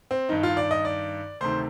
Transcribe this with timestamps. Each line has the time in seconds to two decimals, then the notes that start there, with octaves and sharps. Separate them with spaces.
0.11 C4
0.29 G2 D#3 D#4
0.43 F4
0.57 D5
0.71 D#5
0.85 D5
1.41 D2 C3 D#3 C5